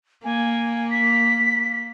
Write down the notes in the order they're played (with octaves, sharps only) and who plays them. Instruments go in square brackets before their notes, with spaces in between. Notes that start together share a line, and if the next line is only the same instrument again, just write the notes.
[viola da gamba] A#3 [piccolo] G#5
[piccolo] B6